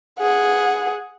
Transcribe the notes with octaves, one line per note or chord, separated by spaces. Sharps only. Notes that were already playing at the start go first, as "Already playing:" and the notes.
G#4 F#5